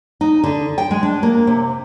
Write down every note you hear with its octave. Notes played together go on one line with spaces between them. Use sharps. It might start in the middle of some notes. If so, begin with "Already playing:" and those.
D#4
D3
G5
G#3
D4
A#3
C3